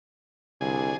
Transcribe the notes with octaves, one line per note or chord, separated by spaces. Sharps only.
C2 D3 G#4 G#5